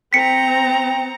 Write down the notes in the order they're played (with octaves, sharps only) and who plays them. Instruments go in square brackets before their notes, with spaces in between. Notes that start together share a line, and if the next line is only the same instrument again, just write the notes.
[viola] C4 A#5 [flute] G5 [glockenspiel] B6 C#7